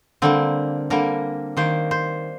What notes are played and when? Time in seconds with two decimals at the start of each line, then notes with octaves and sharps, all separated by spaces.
0.22 D3 G3 A#3 C4
0.90 D3 G3 A#3 A#4
1.57 D#3 A#3 C5
1.91 C5